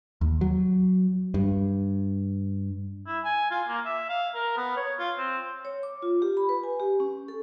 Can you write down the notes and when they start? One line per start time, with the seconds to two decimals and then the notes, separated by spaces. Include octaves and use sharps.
0.21 D#2
0.41 F#3
1.34 G2
3.07 E4
3.24 G#5
3.51 F4
3.68 A#3
3.85 E5
4.09 F5
4.34 A#4
4.57 B3
4.77 C#5
4.99 F4
5.17 C4
5.65 C#5
5.83 D6
6.02 F4
6.22 G4
6.37 B5
6.49 B4
6.64 G#5
6.80 G4
7.00 C#4
7.28 A4